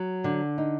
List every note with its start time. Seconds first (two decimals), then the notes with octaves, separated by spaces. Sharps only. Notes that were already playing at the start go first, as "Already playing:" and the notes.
Already playing: F#3
0.24 D3
0.58 D#4